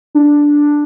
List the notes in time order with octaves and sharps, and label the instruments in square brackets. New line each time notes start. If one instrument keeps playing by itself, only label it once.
[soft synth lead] D4